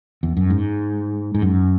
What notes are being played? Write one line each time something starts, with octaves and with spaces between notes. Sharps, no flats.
E2
F#2
G#2
G#2
F#2